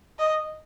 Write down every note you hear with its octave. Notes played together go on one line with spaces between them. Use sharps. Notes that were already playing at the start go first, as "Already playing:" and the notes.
D#5